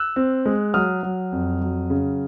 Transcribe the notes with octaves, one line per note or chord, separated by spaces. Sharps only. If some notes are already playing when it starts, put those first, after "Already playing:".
Already playing: E6 F#6
C4
G#3
F#3 D#6 F6
F#3
F2
F#3
C#3